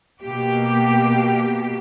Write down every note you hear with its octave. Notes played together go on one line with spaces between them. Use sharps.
B2 A#3 G4